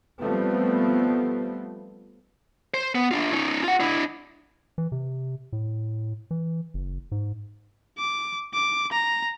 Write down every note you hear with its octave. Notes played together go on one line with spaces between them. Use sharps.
F3 G3 A3 B3 C4
C5
B3
D4 F4
C#4 D#4
F4 F#5
D4 E4
E3
C3
A2
E3
F#1
G#2
D6
D6
A#5